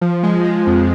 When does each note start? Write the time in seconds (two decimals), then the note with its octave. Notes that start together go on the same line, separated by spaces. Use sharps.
0.01 F3
0.23 G#3
0.44 G#3
0.67 F2